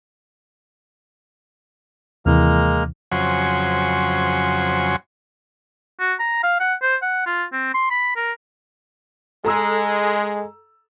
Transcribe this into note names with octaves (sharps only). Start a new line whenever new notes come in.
D#2 C3 E3 G#3 A#3 F6
F2 C#3 F#3 F#4 C5 G#5
F#4
A#5
F5
F#5
C5
F#5
F4
C4
C6
B5
A#4
G#3 A4 A#5 E6